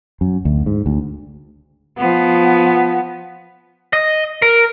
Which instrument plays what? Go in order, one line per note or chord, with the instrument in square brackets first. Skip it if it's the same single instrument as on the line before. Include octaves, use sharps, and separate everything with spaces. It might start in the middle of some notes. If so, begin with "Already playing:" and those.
[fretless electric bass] F#2
D2
G#2
D2
[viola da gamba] F3 B3
[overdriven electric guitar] D#5
A#4